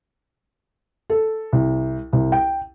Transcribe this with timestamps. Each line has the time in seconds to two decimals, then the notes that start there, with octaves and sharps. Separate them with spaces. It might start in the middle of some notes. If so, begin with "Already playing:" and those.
1.10 A4
1.53 C2
2.13 C2
2.32 G5